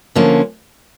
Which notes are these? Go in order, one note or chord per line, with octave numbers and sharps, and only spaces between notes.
D3 F3 A#3 C#4